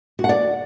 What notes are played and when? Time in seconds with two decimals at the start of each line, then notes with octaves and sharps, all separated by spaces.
0.19 F#4
0.24 F#5
0.29 D5